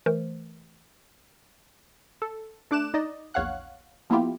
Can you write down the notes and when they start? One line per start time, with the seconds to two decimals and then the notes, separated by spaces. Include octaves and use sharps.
0.06 E3 A3 A#4 C5
2.22 A4
2.71 A3 D4 D6 F#6 E7
2.94 D#4 D5 D#5
3.34 A#1 E2 C#5 F5 F#5 F#6
4.10 F3 A#3 B3 E4 F4 G4